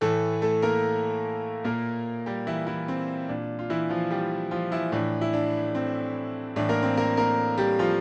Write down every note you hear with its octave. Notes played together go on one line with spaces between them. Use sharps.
A2 E3 A3 A4
A3 A4
A#3 A#4
A#2 A#3 A#4
G3 G4
E3 E4
E3 E4
C4
A#2 D4
F4
E3 E4
F3 F4
G3 G4
F3 F4
E3 E4
A2 E3 D4
E4
D4
C4
A2 E3 D4
A#3 A#4
C4
A#3 A#4
A#3 A#4
G3 G4
F3 F4